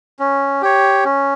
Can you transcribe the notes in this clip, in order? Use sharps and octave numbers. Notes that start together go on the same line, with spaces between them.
C#4
G4 C#5
C#4